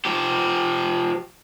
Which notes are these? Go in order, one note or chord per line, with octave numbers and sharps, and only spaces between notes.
F3 G4